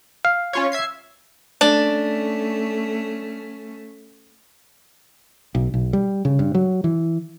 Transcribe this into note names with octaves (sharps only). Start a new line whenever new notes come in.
F5
C#4 F4 C#5
E5 G#6 C7
A3 C#4 D4
B1
B1
G3
C#3
G2
F#3
E3